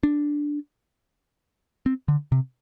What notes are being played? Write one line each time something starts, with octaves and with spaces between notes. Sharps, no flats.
D4
C4
D3
C3